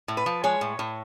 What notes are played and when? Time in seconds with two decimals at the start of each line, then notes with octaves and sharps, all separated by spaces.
0.08 A2
0.17 B4
0.26 F3
0.44 G#3 C#5
0.61 A2
0.79 A2